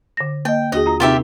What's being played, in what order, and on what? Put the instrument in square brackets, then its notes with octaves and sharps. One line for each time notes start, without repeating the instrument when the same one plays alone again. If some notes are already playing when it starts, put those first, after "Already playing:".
[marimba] D3 A#6
[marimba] A#3 D#5 [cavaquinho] G5
[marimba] D#2 F#4 G#4 [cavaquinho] D#5
[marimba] F4 A#5
[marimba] C3 C4 D#4 [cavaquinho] F4 G4 E5